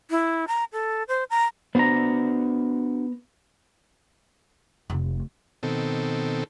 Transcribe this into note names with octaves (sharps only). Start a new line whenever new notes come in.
E4
A#5
A4
C5
A#5
B3 D4 F#4 C5 A#5
F1
B2 D#3 C4 A4